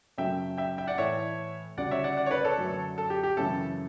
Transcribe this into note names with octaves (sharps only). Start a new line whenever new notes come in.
F#2 C#3 F#3 A3 E5 G5
E5 G5
E5 G5
D5 F#5
A2 E3 A3 C#5 E5
D2 C#3 G3 D5 F#5
C#5 E5
D5 F#5
D5 F#5
C#5
B4 D5
A4 C#5
F#2 D3 F#3 A3
A4
G4
G4
F#2 C#3 E3 A3 A4